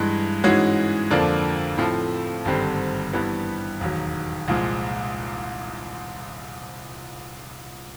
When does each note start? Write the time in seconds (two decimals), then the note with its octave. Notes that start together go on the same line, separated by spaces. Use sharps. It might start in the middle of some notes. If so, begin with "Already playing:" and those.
Already playing: G2 E3 G#3
0.44 G#2 E3 G#3 C#4 F#4
1.10 F2 D3 F3 A#3 D4
1.78 A2 F3 A3 C4
2.45 G#1 G2 D3 G3 C4
3.13 G2 E3 G3 B3
3.80 E1 D#2 D#3 F#3
4.48 C2 A#2 F3 G#3